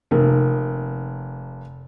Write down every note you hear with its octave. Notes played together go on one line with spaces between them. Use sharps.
F1 A#3